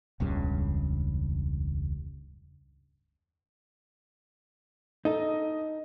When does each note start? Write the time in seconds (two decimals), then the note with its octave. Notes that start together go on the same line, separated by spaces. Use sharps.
0.20 E1 C#2 G2 C#3
5.05 D#4 A4 D#5